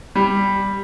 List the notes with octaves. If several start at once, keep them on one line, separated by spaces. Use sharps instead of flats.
G3